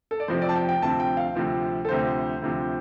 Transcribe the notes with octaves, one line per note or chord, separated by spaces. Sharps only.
A4
D5
F1 F2 C3 F3 C4 C5
D5
A5
G5
G5
D2 C3 F3 C4 A5
G5
F5
D2 C3 F3 C4
A4
D2 C3 F3 C5
D2 C3 F3